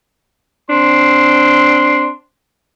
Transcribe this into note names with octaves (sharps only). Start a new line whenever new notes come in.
C4 D4 C6